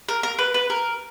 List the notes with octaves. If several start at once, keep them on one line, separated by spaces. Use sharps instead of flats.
A#4
A#4
B4
B4
A#4